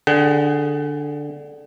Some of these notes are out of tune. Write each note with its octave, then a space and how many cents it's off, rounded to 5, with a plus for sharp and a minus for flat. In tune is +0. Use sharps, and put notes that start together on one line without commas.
D3 +0 G#4 +0 F#5 +45